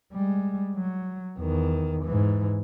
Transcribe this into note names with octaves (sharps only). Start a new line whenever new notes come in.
G3 G#3
F#3
E2 D#3
G#2 E3